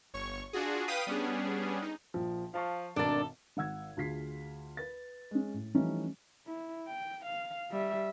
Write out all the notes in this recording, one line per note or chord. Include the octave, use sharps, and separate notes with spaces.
G1 C#5 C#6
D4 F4 F#4 G#4
B4 F5 G5 D#6 B6 D#7
G3 B3 C#4 D4 G#4
D#4
A#1 F3
F3 F5 A5 C#6
G#1 B2 D4 A4 A#4 D5
G#1 F#5 E6 G#6
D2 F4 G#4 B6 C7
B4 A6
G#3 C#4
A2
E3 F3 G3 A3 C#4 D#4
E4
G5
F5
G3 E5